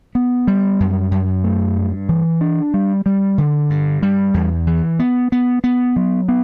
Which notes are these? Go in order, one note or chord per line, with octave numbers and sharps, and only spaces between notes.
B3
G3
F#2
F#2
A3
G2
E3
D4
G3
G3
D3
G2
G3
E2
E3
B3
B3
B3
F#3
B3